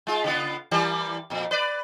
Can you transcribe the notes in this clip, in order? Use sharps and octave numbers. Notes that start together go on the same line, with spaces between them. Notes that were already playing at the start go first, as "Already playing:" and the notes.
G#3 F4
C#3 B3 F4
E3 G3 A#3
F2 A#2
B4 D5